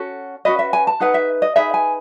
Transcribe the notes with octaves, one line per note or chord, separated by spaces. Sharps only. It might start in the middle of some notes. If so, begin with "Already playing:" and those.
Already playing: C#4 F#4 A4
C#4 F#4 B4 D#5
E5
G#5
A5
D#4 G#4 B4 F#5
E5
D#5
D#4 G#4 B4 E5
G#5